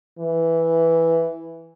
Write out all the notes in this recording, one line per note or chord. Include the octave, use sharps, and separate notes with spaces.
E3